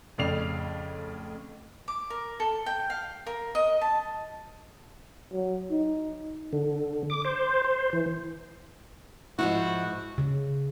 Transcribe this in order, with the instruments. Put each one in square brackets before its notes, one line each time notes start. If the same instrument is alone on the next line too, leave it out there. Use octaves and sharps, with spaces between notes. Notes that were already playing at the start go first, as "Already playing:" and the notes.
[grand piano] F2 A2 C#3 D5 C7 F7
[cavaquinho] D6
A#4
A4
G5
F5
A#4
D#5
A5
[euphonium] F#3
D#4
[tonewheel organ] D3
D6
C5
C5
E3
[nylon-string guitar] G#2 F3 E4 [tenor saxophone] F#4
[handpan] C#3